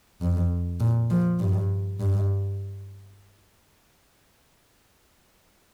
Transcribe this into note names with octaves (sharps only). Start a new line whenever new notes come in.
F2
A#2
F3
G2
G2